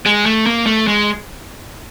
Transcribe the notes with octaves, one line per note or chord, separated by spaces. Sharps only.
G#3
A3
A#3
A3
G#3